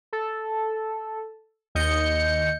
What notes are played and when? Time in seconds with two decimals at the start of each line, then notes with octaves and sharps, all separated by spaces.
0.13 A4
1.75 D#2 D#5 G6 C#7